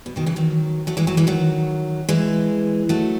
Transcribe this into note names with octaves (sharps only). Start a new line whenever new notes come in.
B2
B2 D#3
C#3 E3
D#3 F#3
F#3 A3
E3 G#3
F#3 A3
E3 G#3
D#3 F#3
E3 G#3
F#3 A3